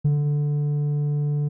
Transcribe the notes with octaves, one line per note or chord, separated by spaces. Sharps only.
D3